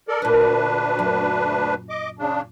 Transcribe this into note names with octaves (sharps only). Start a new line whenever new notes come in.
A4 A#4 D5
D2 A#2 D4 A#4 B4
F#2
D#5 D6
C#3 D4